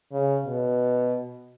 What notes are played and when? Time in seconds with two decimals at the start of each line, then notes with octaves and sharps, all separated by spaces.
0.13 C#3
0.45 B2